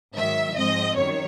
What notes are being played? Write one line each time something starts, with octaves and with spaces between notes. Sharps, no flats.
G#2 D#3 F#3 E5
G#2 F3 G#3 C4 D#5
F#2 D#3 G3 C#5